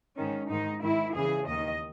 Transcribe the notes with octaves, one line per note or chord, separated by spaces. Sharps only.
G#2 D#3 C#4
G#2 D#3 D#4
G#2 D#3 E4
E2 C#3 E3 G#4
D#2 D#3 D#5